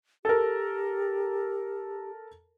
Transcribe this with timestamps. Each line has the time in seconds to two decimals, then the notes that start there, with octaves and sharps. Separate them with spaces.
0.25 G4 A4 A#4